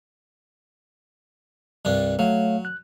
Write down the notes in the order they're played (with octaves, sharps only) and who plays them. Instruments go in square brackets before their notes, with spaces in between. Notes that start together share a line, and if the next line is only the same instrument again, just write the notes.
[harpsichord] C2 G2 D4
[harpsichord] F#3 [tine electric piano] A3 C#5 F5
[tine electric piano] F#6